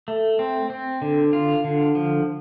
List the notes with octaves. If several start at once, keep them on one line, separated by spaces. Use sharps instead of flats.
A3
C4
C4
D3
F4
D3
F3